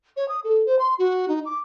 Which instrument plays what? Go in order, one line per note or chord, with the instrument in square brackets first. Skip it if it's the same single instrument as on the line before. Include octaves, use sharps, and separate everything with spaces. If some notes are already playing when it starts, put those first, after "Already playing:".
[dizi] C#5
D#6
A4
C5
C6
F#4
D#4
D6